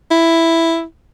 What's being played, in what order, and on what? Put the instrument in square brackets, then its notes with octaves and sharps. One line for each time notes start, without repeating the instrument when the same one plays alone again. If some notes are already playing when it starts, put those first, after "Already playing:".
[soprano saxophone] E4